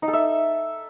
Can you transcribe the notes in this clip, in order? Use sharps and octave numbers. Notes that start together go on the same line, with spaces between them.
D#4
A4
E5